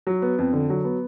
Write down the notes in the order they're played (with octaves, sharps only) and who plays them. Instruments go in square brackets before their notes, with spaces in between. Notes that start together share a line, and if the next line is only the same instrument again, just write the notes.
[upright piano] F#3
B3
F2
D3
F#3
B3